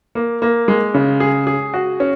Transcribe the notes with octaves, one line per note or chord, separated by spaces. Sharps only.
A#3
A#3
G#3
C#3
G#4
G#4
F#4
C#4